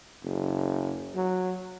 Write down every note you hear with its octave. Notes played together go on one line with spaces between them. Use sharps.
F#1
F#3